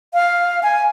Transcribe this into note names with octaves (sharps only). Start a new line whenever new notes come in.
F5
G#5